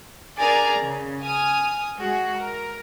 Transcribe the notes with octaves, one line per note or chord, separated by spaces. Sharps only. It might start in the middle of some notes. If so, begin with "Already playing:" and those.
D4 G#4 A#4 D5 G#5 A#5
C#3
G#5 D#6 F6
G#3 F#4 G#4
A#4